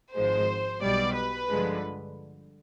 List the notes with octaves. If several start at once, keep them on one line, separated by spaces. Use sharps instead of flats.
G#1 G#2 F3 G#3 C5
B1 B2 G3 D5
B4
G2 D3 F3 G#3